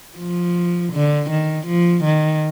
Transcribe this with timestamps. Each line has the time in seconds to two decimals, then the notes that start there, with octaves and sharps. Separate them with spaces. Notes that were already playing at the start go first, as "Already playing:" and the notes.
0.18 F3
0.93 D3
1.30 D#3
1.67 F3
2.05 D#3